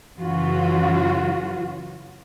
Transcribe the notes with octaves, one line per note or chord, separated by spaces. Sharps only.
F#2 C#3 E3 F4 F#4